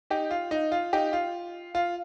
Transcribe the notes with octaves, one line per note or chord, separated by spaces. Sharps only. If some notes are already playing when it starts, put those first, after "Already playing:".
D#4 G4
F4
D#4
F4
D#4 G4
F4
F4